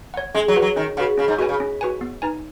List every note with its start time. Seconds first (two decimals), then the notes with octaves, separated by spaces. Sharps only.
0.14 C#5 F#5
0.34 G#3 C#4
0.48 F#3
0.56 F#4 B4 F#5
0.62 F#3
0.76 D#3 C#4
0.97 C#3 F#4 B4 F#5
1.18 C#3 C#4
1.28 G#2
1.38 B2 F#4
1.41 B4 G#5
1.49 C#3
1.60 C#4
1.81 F#4 B4 G#5
2.01 B3
2.22 D#4 B4 G#5